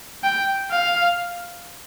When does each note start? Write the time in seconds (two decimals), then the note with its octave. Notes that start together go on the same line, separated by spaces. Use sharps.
0.24 G5
0.71 F5